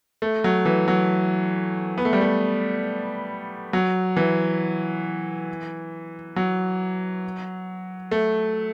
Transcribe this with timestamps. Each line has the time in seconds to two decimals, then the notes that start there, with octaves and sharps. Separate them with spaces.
0.22 A3
0.44 F#3
0.65 E3
0.88 F#3
1.98 B3
2.05 A3
2.13 G3
2.21 A3
3.73 F#3
4.17 E3
6.36 F#3
8.11 A3